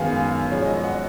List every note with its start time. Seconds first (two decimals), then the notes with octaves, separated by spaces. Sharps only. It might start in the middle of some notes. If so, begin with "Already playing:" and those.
Already playing: F#2 D#3 G#3 B3 F5 G#5
0.16 F5 G#5
0.50 F#2 F3 G#3 C#5
0.66 D#5
0.83 D#5 F#5